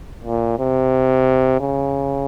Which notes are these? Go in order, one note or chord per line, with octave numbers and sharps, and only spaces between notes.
A#2
C3
C#3